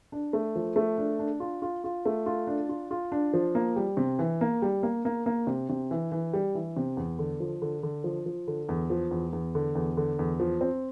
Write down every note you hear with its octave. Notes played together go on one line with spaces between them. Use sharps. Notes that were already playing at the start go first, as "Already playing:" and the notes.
D4
A3
F3
A3
D4
D4
F4
F4
F4
A3
F4
D4
F4
F4
D4
F3
A#3
G3
C3
E3
A#3
G3
A#3
A#3
A#3
C3
C3
E3
E3
G3
E3
C3
E2
D3
F3
D3
D3
F3
F3
D3
E2
F3
E2
E2
D3
E2
D3
E2
F3
C4